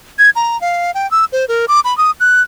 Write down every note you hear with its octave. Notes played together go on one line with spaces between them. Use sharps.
G#6
A#5
F5
G5
E6
C5
A#4
D6
B5
D#6
F#6